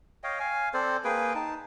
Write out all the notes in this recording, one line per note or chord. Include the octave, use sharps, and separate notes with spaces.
C#5 D#5 F5 G5
F5 G#5
C4 A4 C5 D5
A#3 G#4 B4 G5
D#4 A5